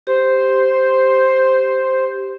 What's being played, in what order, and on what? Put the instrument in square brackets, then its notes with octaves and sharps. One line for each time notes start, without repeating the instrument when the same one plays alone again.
[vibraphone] G4 [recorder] C5